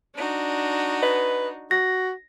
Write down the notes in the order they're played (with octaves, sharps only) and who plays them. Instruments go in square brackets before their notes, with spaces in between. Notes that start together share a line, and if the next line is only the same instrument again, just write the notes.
[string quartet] D4 D#4 F#4
[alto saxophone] B4 [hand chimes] D#5
[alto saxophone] F#4 [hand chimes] A#6